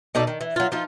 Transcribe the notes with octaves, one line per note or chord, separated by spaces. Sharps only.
B2 D#4 A4 D5
D#3
E3
F#3 F4
F3 D#4 F4